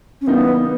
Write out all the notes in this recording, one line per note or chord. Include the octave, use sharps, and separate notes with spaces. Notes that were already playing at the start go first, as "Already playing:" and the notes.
C#4
C#3 E3 G3 A#3 B3 D#4